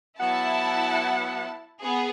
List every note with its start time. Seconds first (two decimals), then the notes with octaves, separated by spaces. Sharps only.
0.20 F#3 B3 E4 F#5 A5
1.80 B3 G#4